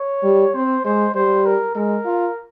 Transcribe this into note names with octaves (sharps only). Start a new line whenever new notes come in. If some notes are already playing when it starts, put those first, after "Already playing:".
Already playing: C#5
G3
C4 C5
G#3 C5
G3 C5
A#4
G#3 A#4
F4